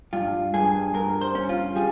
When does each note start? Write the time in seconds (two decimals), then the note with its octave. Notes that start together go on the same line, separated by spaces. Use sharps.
0.13 G2 F4
0.54 G2 G#4
0.94 G2 A#4
1.21 C5
1.35 C#4
1.49 F4
1.76 G3 G#4